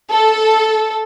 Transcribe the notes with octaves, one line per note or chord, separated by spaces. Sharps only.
A4